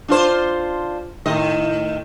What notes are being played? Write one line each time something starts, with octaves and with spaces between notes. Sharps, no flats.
D4 F4 C5
A2 D#3 D#5